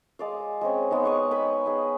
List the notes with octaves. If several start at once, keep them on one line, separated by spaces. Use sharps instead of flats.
G#3 D5 F5
G#3 C4 C#4
G#3 B3 D#4
F#5 C#6 D#6
B4 C#5 G5 B5
D#4 G#4